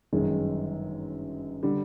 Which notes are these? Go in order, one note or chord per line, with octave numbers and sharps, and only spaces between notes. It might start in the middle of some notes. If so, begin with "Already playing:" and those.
G1 F#2 D#3 G#3
D3 G3